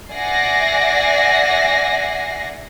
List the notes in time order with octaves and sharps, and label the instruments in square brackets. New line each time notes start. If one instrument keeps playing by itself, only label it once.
[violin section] D5 E5 F#5 G#5 A#6 C7